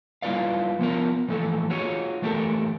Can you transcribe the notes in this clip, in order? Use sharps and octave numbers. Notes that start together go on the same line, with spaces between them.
G3 E4 F4 B4 D5 F5
F3 B3 F4 A#4
E3 F3 A3 A4
F4 F#4 G#4 C#5
D#3 E3 A3 G4 A4 A#4